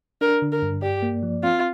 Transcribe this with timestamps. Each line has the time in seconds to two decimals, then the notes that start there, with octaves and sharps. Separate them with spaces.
0.21 D4 A#4
0.42 D3
0.52 A#4
0.62 G2
0.82 G4 D5
1.02 A#3
1.23 F3
1.43 C4 F4